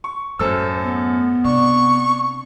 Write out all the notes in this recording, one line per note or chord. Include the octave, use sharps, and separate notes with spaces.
C#6
F#2 A2 A4 C5 E6
B3
C3 D4 C#6